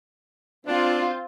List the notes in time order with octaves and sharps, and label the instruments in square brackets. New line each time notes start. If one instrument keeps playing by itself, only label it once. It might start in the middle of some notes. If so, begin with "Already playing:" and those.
[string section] C4 F4 [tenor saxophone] D4